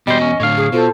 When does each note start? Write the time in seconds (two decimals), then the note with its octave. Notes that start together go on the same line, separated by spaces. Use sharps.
0.07 E2 B2 G3 C5 D#5
0.21 C#4
0.40 A2 D3 C#5 F5
0.57 G#4
0.72 B2 F4 A4 C5